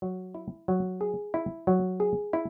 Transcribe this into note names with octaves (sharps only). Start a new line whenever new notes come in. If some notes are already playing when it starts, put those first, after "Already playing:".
F#3
E4
F#3
G#4
E4
F#3
G#4
E4